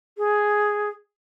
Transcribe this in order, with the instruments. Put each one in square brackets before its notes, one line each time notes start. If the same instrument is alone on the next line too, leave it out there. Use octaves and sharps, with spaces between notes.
[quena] G#4